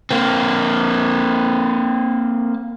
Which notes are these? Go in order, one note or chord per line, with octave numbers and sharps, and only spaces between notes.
A#3 C4